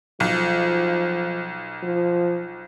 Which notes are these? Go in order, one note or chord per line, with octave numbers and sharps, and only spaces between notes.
B1 F3
F3